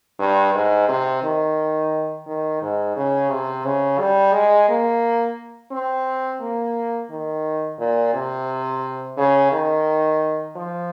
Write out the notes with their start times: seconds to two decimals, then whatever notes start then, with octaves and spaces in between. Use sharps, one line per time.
0.19 G2
0.54 G#2
0.89 C3
1.23 D#3
2.27 D#3
2.62 G#2
2.97 C#3
3.31 C3
3.65 C#3
3.99 G3
4.34 G#3
4.69 A#3
5.72 C4
6.41 A#3
7.10 D#3
7.79 A#2
8.14 C3
9.17 C#3
9.52 D#3
10.56 F3